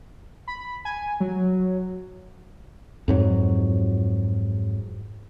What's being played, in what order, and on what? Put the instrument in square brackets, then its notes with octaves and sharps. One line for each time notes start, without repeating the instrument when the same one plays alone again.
[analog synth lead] B5
G#5
F#3
[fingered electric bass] F2 G#2 F#3